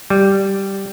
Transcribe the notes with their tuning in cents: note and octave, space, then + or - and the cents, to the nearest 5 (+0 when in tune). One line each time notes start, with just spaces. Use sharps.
G3 -5